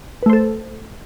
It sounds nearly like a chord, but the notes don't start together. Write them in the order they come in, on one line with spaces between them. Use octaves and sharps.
B4 A3 C5 A4